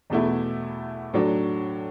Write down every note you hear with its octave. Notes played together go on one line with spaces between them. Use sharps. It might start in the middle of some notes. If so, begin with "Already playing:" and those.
E2 B2 A3 E4
A2 F#3 D4